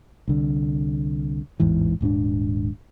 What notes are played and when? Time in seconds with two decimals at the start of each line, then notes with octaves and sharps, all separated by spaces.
0.28 C2 D3
1.60 A1 E2 G#2 E3
2.01 D#1 G#2 C#4 D4